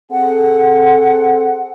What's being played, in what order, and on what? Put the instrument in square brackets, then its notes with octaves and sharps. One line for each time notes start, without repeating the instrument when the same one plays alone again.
[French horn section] C4 G#4 A4 [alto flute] F#5